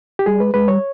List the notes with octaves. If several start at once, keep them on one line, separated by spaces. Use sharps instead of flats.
G4
G3 G#4
G#3 B4
G#3 B4
G3 C#5